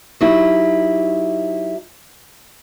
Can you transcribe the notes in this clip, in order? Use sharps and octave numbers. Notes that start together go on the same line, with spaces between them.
F#3 D#4 E4 G4